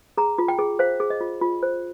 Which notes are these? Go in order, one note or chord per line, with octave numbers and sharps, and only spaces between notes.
G#4 A#5
F4
G5
G#4
C5 F5
G#4
D#5
F4
F4
C5